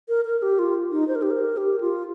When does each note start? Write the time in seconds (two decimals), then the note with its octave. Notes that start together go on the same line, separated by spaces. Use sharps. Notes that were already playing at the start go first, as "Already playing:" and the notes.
0.09 A#4
0.25 A#4
0.42 G4
0.59 F4
0.92 D#4
1.08 C5
1.15 A#4
1.22 G4
1.31 A#4
1.57 G4
1.81 F4